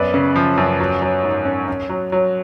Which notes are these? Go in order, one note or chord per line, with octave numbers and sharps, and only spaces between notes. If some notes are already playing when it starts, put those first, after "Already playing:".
Already playing: F#2 B3 B4 D5
C#3
F3
F#2
F#3
F#3
G#2
C#4
C#4
F#3
F#3